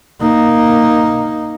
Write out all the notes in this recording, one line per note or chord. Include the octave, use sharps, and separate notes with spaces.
A#3 D#4